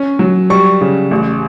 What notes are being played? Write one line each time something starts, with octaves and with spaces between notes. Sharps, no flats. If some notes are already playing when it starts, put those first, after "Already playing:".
Already playing: C#4
F#3
G3 C#6
C#3
A1